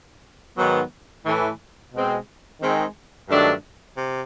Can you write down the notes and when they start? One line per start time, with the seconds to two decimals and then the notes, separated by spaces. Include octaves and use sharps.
0.56 G#2 D#3 F#3 B3
1.24 A2 E3 A3
1.92 B2 G#3 C4
2.60 D#3 G#3 C4
3.28 G2 D#3 F#3 A3 D4
3.96 C3